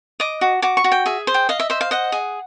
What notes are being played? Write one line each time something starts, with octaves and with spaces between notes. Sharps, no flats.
D#5 D6
F#4
F#4 D6
C#6
F#4
G5
G#4 E5
C5
G5
D#5 F5
E5
C5 E5
F5
D#5 F#5
G#4